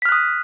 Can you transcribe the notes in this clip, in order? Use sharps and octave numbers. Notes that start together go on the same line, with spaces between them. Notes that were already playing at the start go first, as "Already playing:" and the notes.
D#6 F6 F#6 B6